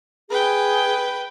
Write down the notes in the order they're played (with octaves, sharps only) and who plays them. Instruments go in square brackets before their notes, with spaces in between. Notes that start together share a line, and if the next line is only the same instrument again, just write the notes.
[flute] G#4 [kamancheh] B4 G5